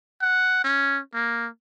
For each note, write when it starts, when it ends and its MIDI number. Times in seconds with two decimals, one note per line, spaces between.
0.22 0.62 78
0.64 1.00 61
1.14 1.48 58